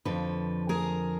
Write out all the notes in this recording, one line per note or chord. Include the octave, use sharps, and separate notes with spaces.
F2 D3 F3 A4 B4
G#4 A#4